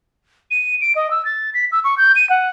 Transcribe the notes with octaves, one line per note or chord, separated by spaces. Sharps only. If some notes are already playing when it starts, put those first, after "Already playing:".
D#7
D7
D#5
E6
A6
B6
E6
C#6
G6
D#7
F#5